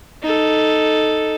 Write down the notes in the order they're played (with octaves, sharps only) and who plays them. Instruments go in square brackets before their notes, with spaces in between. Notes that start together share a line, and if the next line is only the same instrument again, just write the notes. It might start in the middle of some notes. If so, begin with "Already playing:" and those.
[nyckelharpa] D#4 A4